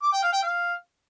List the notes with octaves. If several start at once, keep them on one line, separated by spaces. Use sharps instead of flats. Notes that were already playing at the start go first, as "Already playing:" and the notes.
D6
G5
F5
G5
F5